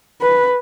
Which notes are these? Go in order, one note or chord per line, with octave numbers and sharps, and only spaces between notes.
B4